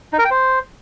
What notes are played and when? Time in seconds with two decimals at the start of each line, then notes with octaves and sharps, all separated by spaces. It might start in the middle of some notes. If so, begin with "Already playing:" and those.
0.13 D#4
0.19 A#4
0.25 G5
0.31 C5